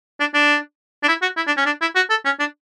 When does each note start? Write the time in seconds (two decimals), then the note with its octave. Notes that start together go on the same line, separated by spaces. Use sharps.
0.20 D4
0.34 D4
1.03 D4
1.08 E4
1.22 F#4
1.37 E4
1.47 D4
1.57 C#4
1.66 D4
1.81 E4
1.96 F#4
2.10 A4
2.25 C#4
2.39 D4